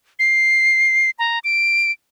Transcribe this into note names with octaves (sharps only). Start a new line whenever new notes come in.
C7
A#5
D7